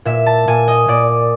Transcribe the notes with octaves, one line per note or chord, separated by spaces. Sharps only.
A#2 E5
A5
A#2 G#5
D#5
A#2 D5